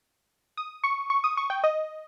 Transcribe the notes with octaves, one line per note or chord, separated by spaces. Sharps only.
D#6
C#6
C#6
D#6
C#6
G5
D#5